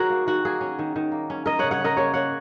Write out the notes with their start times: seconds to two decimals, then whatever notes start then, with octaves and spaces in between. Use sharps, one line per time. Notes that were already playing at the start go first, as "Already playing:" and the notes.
Already playing: D#3 F#4 G#4 A#4 C#5
0.10 A#3
0.27 D#3 F#4
0.45 A#3 G#4
0.61 C#4
0.79 D#3
0.96 D#3
1.12 A#3
1.30 C#4
1.46 C#4 A#4 D#5
1.59 C#3 C#5 F#5
1.71 C#5 F#5
1.80 C#4 A#4 D#5
1.97 A#3 G#4 C#5
2.14 A#3 C#5 F#5